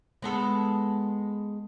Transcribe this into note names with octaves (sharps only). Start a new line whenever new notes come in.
G#3 B3 A4